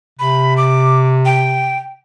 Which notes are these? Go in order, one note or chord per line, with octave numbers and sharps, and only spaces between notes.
C3 B5
D6
G5